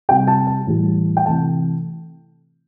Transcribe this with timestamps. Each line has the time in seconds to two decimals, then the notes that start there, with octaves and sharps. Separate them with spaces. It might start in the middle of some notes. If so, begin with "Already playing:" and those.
0.09 C3 G3 G5
0.27 A5
0.47 A5
0.67 A2 E3 G3
1.17 G5
1.26 C3 E3 A3 A5